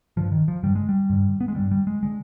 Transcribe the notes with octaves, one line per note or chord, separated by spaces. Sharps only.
G2 D3 F3
D#3
F3
G2 D3 G3
G#3
G3
G2 D3
B3
G#3
G2 D3 G3
G3
G#3
D3 G#3